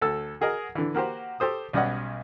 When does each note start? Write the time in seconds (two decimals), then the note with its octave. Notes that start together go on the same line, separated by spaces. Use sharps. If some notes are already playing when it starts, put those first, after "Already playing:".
0.01 D2 A4 E6
0.41 F#4 G#4 A#4 D#5
0.75 D3 E3
0.95 A#3 F#4 G4 C5
1.40 G4 A4 C5 D#6
1.73 B1 G3 C#4 D5 D#5 F#5